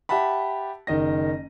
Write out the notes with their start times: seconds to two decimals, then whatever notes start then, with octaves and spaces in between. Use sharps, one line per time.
0.09 G4 E5 F#5 A5 B5
0.87 F#1 D#3 D#5 A#6